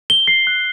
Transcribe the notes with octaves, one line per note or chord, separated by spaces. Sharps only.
G7
C7
F#6